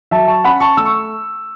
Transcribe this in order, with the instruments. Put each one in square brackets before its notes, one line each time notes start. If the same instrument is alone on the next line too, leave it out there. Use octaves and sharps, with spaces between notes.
[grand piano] F#3 E5 A5
A5 C#6
C#4 F#5 B5
A5 C#6
A3 E6
C#6